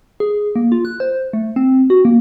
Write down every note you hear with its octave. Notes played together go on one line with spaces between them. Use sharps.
G#4
A#3
F4
F#6
C5
A3
C4
F#4
A#3